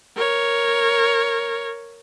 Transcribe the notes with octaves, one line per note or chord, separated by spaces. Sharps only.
A#4 C#5